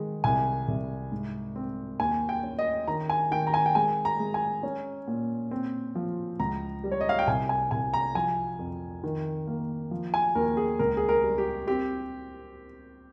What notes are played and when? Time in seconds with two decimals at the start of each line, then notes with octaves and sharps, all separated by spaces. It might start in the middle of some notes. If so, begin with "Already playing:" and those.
Already playing: D#3 G#3
0.24 C2 G#5
0.68 C2
1.12 G#2
1.56 C4
2.00 D#2 G#5
2.29 G5
2.43 C#4
2.59 D#5
2.88 D#3 A#5
3.10 G#5
3.31 D#3 G5
3.47 A#5
3.54 G#5
3.66 G5
3.75 G#3 G#5
4.05 A#5
4.19 G#3
4.34 G#5
4.63 C#4
5.08 A#2
5.51 C4
5.95 F3
6.39 C#2 A#5
6.84 G3
6.91 C#5
7.01 D#5
7.09 F5
7.19 G5
7.27 C2 G#5
7.49 G#5
7.71 C2 G#5
7.94 A#5
8.15 F3 G#5
8.59 F2
9.04 D#3
9.47 A#3
9.91 F3
10.14 G#5
10.35 D#2 A#4
10.57 G#4
10.79 C#2 A#4
10.97 G#4
11.09 A#4
11.23 G3
11.38 G4
11.67 C4 G4